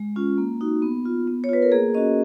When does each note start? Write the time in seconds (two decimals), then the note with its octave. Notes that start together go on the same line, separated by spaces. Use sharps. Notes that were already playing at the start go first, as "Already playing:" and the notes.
Already playing: G#3
0.16 C#4 F4
0.38 A#3
0.61 D#4 F#4
0.82 B3
1.06 F4
1.27 B3
1.44 C#5
1.49 F4 B4
1.62 A#4
1.72 A#3 G#4
1.95 C#4 F#4 D#5